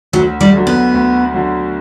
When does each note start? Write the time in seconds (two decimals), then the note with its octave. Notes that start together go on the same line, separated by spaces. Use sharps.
0.13 D2 F#3
0.41 G3
0.54 D3 F#3
0.67 B3
0.94 D2
1.34 D3 F#3